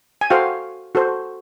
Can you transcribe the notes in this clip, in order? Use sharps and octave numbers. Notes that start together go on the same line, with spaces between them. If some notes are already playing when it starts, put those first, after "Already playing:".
G#5
F#4 A4 C5 F5 G5
F#4 A4 C5